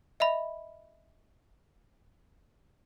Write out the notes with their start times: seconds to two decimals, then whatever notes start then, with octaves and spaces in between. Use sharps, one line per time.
0.20 D#5 E5 B5